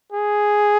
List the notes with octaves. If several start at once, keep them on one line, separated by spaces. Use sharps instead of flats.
G#4